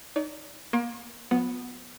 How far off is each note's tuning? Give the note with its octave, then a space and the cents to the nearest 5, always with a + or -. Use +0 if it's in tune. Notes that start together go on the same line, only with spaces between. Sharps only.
D#4 -15 D5 -45
A#3 +30 C6 +45
F3 +45 B3 +0